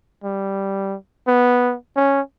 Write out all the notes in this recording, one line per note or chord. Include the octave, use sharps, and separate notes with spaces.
G3
B3
C#4